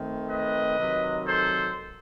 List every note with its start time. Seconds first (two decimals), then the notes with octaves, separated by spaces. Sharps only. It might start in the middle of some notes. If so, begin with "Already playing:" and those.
Already playing: D#3 A3 C4
0.29 B4 D#5
0.78 C3 D#3 F#3
1.26 A4 C5